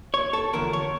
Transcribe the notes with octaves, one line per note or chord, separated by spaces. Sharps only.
C#5
A4
E2 D3 F3 A3 A#4
C#5